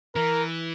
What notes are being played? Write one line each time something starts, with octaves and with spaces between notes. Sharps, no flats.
E3 A#4